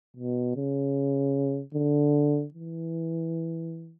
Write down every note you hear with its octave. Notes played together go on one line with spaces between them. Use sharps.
B2
C#3
D3
E3